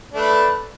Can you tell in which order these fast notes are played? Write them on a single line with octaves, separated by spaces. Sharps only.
D4 A3 B4